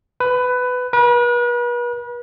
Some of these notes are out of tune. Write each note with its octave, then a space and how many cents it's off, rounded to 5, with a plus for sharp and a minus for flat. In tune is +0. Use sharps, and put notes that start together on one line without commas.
B4 +15
B4 -40